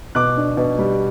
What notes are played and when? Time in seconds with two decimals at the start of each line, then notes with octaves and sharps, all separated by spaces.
0.15 B2 D6 F#6
0.37 D4
0.57 B2
0.79 G3